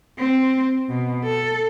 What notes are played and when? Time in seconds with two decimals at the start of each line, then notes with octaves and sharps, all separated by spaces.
0.18 C4
0.89 B2
1.24 A4